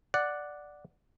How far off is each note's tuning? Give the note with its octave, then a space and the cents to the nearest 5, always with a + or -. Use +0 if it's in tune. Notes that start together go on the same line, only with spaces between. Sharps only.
D5 +0 F#5 +0